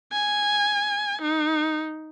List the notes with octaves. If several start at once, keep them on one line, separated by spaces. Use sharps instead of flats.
G#5
D#4